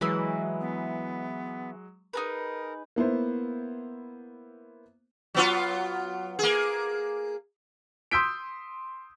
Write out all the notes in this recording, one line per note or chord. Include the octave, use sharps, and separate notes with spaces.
E3 F#3 G#3 E4 F#4 B4 D#5
B3
D#4 G#4 A#4 B4
A#3 B3 E4 C5
F#3 B3 F4
A#3 G#4
C6 D#6 E6 G6 B6 D7